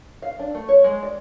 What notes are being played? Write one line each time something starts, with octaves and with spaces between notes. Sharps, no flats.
F5
D4
A3
C#5
G#3
D5